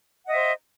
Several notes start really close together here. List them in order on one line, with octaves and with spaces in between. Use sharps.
F#5 D#5 E5 C5